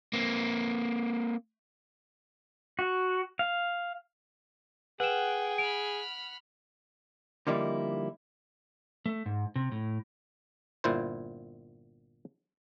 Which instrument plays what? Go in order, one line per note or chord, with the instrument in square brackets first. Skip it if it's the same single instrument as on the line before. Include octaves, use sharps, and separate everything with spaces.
[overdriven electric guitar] A#3 C4
[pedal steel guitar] F#4
F5
[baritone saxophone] G#4 [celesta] B4 E7 [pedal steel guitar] F#5 [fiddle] G5
[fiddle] B5 F6 [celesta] D7
[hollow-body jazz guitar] D3 F3 G3 A#3 D#4 E4
[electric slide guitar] A3
G#2
C3
A2
[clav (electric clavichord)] G1 A#2 E4 C5